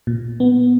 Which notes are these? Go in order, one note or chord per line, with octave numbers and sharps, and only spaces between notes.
A#2
B3